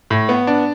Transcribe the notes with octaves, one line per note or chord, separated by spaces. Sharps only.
A2
B3
D4